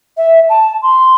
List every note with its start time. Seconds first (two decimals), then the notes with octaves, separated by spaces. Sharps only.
0.17 E5
0.49 A5
0.82 C6